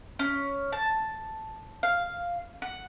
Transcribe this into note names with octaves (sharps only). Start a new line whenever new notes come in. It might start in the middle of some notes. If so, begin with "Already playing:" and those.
C#4
A5
F5
F#5